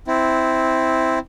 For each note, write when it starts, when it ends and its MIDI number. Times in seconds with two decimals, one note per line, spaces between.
0.07 1.19 60
0.07 1.19 64